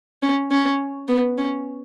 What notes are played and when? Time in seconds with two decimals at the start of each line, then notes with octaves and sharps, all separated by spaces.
0.23 C#4
0.51 C#4
1.09 B3
1.38 C#4